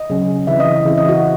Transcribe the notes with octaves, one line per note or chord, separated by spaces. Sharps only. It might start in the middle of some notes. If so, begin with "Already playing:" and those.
Already playing: D#5
C#3 F#3 C#4
C#3 E3 C4 E4 E5
D#5
C#3 E3 C4 E4
D#5
F#4